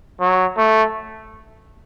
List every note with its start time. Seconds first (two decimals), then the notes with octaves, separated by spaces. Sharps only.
0.20 F#3
0.57 A3